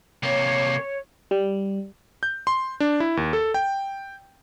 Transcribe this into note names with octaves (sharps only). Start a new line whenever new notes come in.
C3 A#3 C#5
G3
G6
C6
D4
E4
D#2
A4
G5